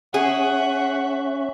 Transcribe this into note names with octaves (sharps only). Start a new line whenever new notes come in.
C#4 G#4 E5 F#5